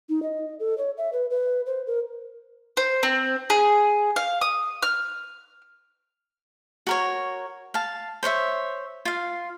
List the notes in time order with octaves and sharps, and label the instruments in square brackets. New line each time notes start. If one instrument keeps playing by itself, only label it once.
[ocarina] D#4
D#5
A4
C#5
E5
B4
B4
C5
A#4
[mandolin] C5
C4
G#4
F5
D#6
F6
[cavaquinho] F#4 A#4 C#5
F5 A5
C5 C#5 D#5 E5
F4 F5